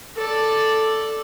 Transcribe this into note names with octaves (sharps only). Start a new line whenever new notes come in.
A4 D5